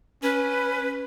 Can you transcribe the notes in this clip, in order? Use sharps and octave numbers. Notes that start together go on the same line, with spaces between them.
C#4 B4